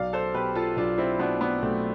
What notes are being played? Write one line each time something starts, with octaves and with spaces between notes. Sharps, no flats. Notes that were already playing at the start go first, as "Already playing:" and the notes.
Already playing: B1 D5 F5
A4 C5
B2 G4 B4
F4 A4
B1 D4 F4
C4 E4
B2 B3 D4
B3 D4
B1 A3 C4